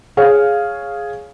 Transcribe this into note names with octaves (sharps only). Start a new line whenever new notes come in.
G#4 C#5 F5